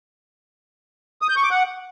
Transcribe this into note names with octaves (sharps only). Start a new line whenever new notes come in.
D#6
G6
C#6
D6
F#5